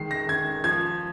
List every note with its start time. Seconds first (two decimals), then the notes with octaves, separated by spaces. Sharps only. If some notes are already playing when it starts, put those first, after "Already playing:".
Already playing: D#3 G#3 C7
0.11 A#6
0.28 D#3 G#6
0.64 F3 G#6